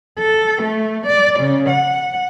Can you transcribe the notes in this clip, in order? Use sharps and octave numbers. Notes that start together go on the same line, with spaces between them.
A4
A3
D5
C#3
F#5